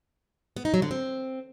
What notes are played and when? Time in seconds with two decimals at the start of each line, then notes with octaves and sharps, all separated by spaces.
0.56 B3
0.65 D#4
0.74 F#3
0.82 D3
0.91 C4